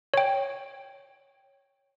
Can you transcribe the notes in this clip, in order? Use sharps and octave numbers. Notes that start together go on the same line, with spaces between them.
C#5 G5